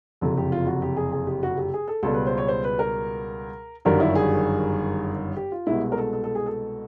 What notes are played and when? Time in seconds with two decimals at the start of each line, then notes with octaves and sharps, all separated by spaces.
0.21 F#1 F2 C3 A4
0.37 G4
0.52 F4
0.66 F#4
0.82 G4
0.97 G#4
1.12 G#4
1.27 G4
1.43 F#4
1.57 G4
1.74 G#4
1.88 A4
2.03 C#2 B2 G3 A4
2.14 B4
2.27 C5
2.38 C#5
2.48 C5
2.64 B4
2.79 A#4
3.85 G1 F#2 D#3 G3 A#4
4.00 E4
4.15 G#4
5.36 G4
5.52 F4
5.66 C2 B2 G#3 E4
5.92 A#4
5.97 A4
6.13 A4
6.24 A4
6.35 G#4
6.46 A4